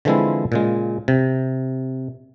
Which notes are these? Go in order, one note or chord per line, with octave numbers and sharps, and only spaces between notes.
D3 E3 F3 G#3 C4 E4
A#2 C#3 G#3
C3